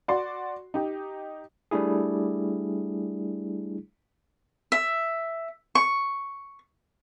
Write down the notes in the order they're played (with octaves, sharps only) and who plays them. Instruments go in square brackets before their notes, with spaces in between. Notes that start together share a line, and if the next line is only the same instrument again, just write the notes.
[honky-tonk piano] F#4 D5 C6
D#4 G4
[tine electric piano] G3 A3 D4 E4 G#4
[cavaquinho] E5
C#6